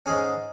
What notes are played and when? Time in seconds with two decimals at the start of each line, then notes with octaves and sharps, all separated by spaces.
0.06 G#2 G#3 C#4 G#4